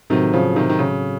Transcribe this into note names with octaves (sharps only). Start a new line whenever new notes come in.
A2 C3 D#3 F#3 C4 F#4 A4
C#3 F3
C3 D#3
D#3
C#3